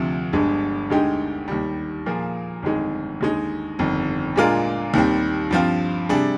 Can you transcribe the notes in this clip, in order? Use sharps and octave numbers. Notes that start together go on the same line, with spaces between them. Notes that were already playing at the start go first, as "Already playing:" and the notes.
Already playing: D2 C3 F3
G1 G2 D3 G#3
D2 D3 G#3 D#4 G4
D#2 D#3 G3
A#2 F3 A#3 F4 G#4
G1 F2 D#3 G#3 D#4
D#2 D3 G#3 D#4
G1 F2 D#3
A#2 G#3 D4 F4 A#4
D#2 D#3 G3 C4
G2 F3 C4 F4
C3 G3 D4 G#4